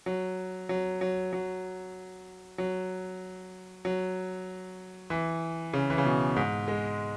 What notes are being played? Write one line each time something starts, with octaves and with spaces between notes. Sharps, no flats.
F#3
F#3
F#3
F#3
F#3
F#3
E3
C#3
E3
C#3
B2
G#2
G#3